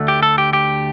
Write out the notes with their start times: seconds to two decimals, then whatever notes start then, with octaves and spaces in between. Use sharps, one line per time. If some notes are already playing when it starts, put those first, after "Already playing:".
Already playing: D2 D3 A3
0.08 G4
0.23 A4
0.38 G4
0.53 G4